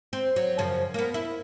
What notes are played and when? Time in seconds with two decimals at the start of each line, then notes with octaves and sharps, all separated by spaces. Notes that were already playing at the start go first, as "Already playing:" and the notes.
0.13 C4
0.36 F#3
0.58 F#2 C#3 F3
0.94 A#3 B3
1.14 E4